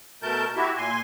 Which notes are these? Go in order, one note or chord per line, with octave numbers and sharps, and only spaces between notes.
B2 A3 A#4 A5 G6
E4 F#4 G4 E5
A#2 G#5 C6